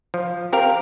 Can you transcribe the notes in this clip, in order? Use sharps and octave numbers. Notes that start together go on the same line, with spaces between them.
F3
C4 G4 A#4 F5